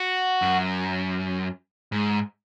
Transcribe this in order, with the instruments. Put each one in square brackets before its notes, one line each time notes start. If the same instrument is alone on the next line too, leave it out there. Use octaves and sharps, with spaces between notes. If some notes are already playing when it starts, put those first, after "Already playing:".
Already playing: [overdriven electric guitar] F#4
[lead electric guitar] F#2
G#2